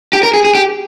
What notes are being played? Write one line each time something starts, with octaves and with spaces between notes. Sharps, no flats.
G4
A#4
G#4
G#4
G4